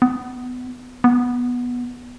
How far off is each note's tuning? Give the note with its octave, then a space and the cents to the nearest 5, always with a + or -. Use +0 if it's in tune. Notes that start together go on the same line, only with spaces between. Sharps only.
B3 +20
B3 -10